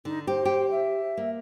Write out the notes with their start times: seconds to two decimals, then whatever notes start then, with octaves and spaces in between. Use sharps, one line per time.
0.05 D3 D#4
0.27 G4 C5
0.45 G4
0.70 E5
1.17 A#3